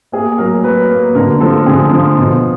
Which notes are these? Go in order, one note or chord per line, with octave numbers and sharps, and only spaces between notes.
A#3 G#4
F#3 A#4
F#3 B4
A#3
D3 A#4
F3 A4
D3 G#4
F3
B2